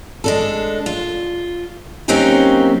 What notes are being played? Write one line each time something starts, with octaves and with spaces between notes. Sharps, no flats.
G#3 D4 A4
F4
F#3 A#3 C4 C#4 D#4 G4